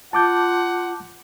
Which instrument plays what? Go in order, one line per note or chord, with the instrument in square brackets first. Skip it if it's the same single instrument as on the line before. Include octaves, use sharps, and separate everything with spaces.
[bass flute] F4 [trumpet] F#5 [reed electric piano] A5 D6 G6